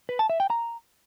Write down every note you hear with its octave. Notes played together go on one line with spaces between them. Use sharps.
B4
A5
E5
G5
A#5